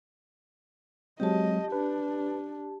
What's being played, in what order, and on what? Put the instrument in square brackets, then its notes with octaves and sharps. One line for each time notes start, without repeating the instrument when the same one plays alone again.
[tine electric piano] F#3 G#3 C4 [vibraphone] G4 A5 [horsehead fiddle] D#5
[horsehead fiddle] D4 [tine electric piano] B4